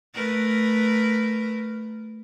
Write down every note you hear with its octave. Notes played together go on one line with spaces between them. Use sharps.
A3 A#4 B4